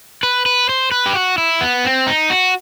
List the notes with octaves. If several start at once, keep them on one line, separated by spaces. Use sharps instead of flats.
B4
B4
C5
B4
G4
F#4
E4
B3
C4
D#4
F#4